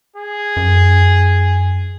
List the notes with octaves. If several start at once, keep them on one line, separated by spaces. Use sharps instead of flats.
G#4
F#2